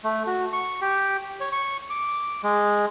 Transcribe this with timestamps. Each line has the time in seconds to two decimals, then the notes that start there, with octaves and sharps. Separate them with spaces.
0.04 A3
0.27 F#4
0.53 C#6
0.81 G4
1.40 C#5
1.52 C#6
1.90 D6
2.43 G#3